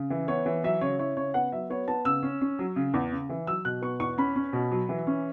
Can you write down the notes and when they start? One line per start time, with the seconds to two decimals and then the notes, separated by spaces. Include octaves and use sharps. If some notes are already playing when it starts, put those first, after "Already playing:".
Already playing: C#3
0.10 E3
0.28 B3 C#5
0.46 E3
0.64 F#3 E5
0.81 C#3 C#5
0.99 E4 C#5
1.17 C#3 C#5
1.34 B3 F#5
1.52 F#3 E5
1.70 B3 C#5
1.88 B3 A5
2.05 C#3 E6
2.23 C#4
2.41 C#4
2.59 F#3
2.76 C#3
2.94 E2
3.12 C#3
3.29 E3
3.47 F#3 E6
3.65 B2 F#6
3.82 B3 C#6
4.00 E2 C#6
4.18 C#4 B5
4.36 C#4
4.53 B2
4.71 F#3
4.89 E3
5.07 C#4